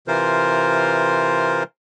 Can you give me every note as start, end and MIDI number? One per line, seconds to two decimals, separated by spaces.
0.08 1.63 48
0.08 1.63 52
0.08 1.63 65
0.08 1.63 70
0.08 1.63 72